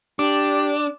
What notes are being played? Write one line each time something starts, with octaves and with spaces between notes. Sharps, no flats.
D4 G4 D6